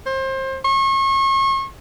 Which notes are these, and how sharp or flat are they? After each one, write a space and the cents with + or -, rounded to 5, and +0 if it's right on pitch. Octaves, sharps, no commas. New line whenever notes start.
C5 +30
C#6 -35